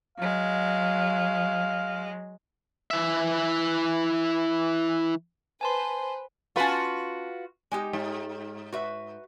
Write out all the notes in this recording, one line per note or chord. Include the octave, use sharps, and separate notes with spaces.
F#3 G#3 F5
E3 E5
B4 C5 G#5 A5 C6
C#4 F4 F#4 B4 A5
G#3 D#4 G4
G#2
F#4 B4 E5